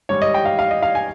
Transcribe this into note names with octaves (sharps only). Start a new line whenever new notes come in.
G#2 D#3 G3 C#5
D#5
G5
F5
F5
D#5
F5
G#5